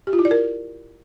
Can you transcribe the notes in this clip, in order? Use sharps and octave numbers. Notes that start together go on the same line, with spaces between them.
G4
F4
E4
D5
A#4